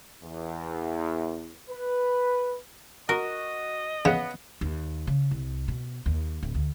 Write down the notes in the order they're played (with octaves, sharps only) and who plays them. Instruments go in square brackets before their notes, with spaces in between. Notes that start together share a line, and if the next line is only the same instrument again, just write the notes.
[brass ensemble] E2
B4
[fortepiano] F#4 [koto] A#4 [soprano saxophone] D#5
[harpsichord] C#3 [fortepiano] B3 F#5
[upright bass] D#2
C#3
C2
B2
D#2
D1
D2